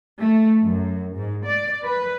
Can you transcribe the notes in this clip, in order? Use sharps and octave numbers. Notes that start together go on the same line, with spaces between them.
A3
F#2
G#2
D5
B4